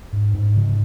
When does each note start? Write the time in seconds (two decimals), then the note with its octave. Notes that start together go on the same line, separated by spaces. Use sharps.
0.13 G#2
0.34 G#2
0.56 C#3